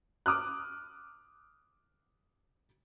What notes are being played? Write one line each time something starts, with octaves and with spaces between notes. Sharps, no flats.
D6 D#6 F6 F#6